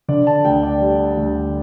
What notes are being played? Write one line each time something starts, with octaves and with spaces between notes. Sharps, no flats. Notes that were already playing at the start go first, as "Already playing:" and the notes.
D3 D5
A5
D2 G5
D5
G3
D2